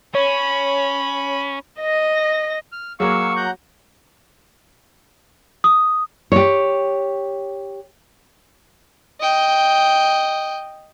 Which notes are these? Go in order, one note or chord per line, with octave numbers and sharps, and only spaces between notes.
C#4 C#5 B5
D#5 A#6
F6
F#3 A#3 G#4 F5 C#6 E6
F#5 A#5 G6
D#6
G4 C#5
D#5 G5